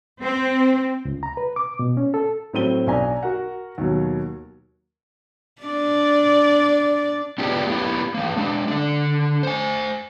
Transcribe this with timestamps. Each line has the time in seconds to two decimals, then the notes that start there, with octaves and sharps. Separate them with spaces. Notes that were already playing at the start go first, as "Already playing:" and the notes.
0.22 C4
1.05 C#2
1.23 A#5
1.37 B4
1.56 D6
1.79 B2
1.97 C#4
2.14 A4
2.53 A2 F#3 C4 A4 D#7 G7
2.87 B1 D4 G#5 A#5
3.23 F#4 A#4 F#5
3.78 D#2 B2 F#3
5.62 D4 D5
7.38 B3 D4 F4 G4 G#4 B4
7.67 A#3 B3 E4 G4
8.15 E3 A#3
8.37 G#3 D4
8.68 D3 D4
9.43 C5 G#5